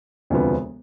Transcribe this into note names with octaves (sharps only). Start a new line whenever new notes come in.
E1 D2 C3 F3 B3